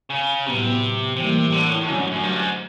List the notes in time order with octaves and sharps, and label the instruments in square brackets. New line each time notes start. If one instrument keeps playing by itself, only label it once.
[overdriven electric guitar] C#3
[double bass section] A2 F#3 B3 [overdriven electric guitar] C3
[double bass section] A2 E3 G3 A#3 [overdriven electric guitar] C3
[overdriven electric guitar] D3
A2
A2
[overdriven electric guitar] G#2 [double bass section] D3 F#3 A3 C#4
[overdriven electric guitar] F#2
F#2
G2
G#2